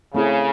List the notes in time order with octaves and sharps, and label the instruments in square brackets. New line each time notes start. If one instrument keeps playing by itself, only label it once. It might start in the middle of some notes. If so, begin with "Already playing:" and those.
[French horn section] C#3 [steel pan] A3 C4 E4 G#4